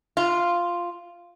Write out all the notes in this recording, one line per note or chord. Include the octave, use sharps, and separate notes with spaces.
F4